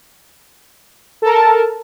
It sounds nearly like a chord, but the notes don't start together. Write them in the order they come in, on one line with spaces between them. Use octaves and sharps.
A4 A#4 A5